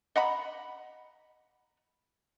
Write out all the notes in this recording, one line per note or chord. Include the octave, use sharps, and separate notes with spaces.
D#5 F#5 A#5 B5